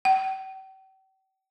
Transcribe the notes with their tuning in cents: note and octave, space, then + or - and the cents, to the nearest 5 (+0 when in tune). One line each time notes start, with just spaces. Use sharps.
G5 -45